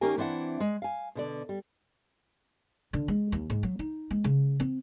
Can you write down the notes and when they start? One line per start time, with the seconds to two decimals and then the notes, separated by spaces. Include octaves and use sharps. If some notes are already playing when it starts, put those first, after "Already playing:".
0.01 D#3 A#3 C#4 G4 A#4 G#5
0.18 E3 C4 D4 E4 F#5
0.60 G#3
0.82 F5 G#5
1.15 B2 D3 D5
1.49 G3
2.93 D3
3.08 G#3
3.32 D#2
3.50 G#2
3.63 F#3
3.79 D#4
4.11 G#3
4.24 C#3
4.60 C4